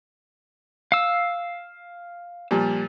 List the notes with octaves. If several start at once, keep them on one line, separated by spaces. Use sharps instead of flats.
F5 E6
A#2 F3 G3